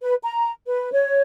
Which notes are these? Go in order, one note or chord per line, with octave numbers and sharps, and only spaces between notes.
B4
A#5
B4
C#5